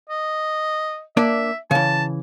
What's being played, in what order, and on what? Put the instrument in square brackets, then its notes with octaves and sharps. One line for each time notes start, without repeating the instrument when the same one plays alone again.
[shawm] D#5
[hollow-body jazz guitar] A#3 D4 D5 [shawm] E5
[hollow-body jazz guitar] C#3 E3 [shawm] A5